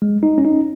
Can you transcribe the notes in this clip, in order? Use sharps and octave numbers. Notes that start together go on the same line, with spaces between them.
G#3
D#4
C#4
D#4